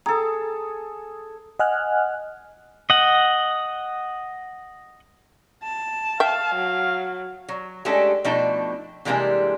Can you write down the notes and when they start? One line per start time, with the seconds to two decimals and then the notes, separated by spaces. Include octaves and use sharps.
0.06 G#4 A4 A#5
1.59 D#5 F#5 G#5 F6 F#6
2.90 D#5 F#5
5.64 A5
6.20 E5 F5 G5
6.55 F#3
7.49 F#3
7.85 G#3 A3 C#4 D4 G4 A4
8.24 B2 F3 A3 D4 D#4 G5
9.05 C3 E3 G3 G#3 A#3 D4